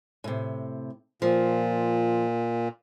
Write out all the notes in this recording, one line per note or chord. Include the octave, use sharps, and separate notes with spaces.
A2 C3
A#2 F3